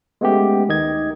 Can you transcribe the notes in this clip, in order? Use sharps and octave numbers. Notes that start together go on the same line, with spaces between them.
G#3 A3 B3 C#4 G4
D2 D#3 D#5 G#6